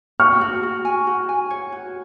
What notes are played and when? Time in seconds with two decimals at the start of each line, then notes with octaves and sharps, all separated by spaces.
0.20 F#4 C#6 F6
0.41 F#4
0.63 F#4
0.85 G#5
1.07 F#4
1.29 G#5
1.50 C#5
1.72 F#4